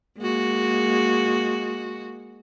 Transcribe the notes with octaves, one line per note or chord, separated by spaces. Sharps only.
G#3 A#3 F#4